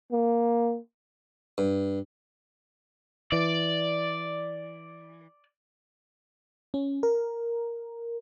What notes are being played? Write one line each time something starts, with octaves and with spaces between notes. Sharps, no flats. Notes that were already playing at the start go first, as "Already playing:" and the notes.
A#3
G2
E3 D5
C#4
A#4